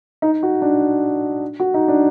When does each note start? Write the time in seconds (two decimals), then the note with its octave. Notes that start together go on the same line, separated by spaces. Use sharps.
0.22 D#4
0.43 F#4
0.62 D4
1.60 F#4
1.74 D#4
1.88 D4